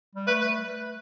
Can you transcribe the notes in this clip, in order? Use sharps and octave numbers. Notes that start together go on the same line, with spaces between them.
G3
A3 B4
B4